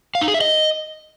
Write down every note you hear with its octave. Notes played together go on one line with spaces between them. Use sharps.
F5
D#4
G#4
E5
D#5